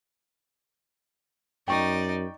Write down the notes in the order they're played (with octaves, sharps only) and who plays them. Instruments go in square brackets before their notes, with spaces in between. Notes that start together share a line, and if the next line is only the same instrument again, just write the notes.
[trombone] F#2 [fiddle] D#4 D5 [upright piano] G5 C#6